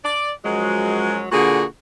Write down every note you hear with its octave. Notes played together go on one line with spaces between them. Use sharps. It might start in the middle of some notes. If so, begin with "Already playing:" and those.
D5
F#2 F3 F#3 G#3
A#2 D3 F#4 G#4